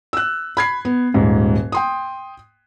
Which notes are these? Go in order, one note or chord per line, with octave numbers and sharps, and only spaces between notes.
E6 F#6
B5 G#6 C7
B3
D#1 G#2
G5 C6 D#6